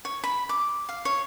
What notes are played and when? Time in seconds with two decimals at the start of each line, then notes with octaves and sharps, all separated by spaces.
0.05 C#5
0.24 B5
0.49 D6
0.89 F5
1.05 C#5